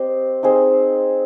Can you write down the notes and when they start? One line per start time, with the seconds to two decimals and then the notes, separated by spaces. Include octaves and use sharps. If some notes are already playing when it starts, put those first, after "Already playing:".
Already playing: C4 G4 C5 D#5
0.43 C4 D#4 G#4 C5